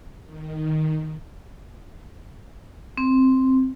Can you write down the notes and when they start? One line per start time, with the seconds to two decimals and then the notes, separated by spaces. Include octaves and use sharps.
0.24 D#3
2.98 C4